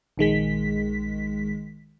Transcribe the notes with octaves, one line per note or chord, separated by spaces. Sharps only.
A#1 D#3 G#3 B6